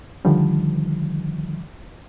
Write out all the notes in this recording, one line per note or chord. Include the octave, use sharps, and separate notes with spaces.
D3 D#3 F3 G3